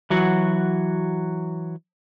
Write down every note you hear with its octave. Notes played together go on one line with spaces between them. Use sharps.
E3 F#3 F#4